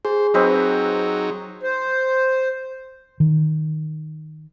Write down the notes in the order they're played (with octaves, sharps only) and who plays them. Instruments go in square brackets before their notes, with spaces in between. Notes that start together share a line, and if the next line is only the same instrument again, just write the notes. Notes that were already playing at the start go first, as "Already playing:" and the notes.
[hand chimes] G#4 [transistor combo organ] C5
[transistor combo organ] F#3 D#4 [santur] C4 B4 D#5
[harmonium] C5
[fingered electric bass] D#3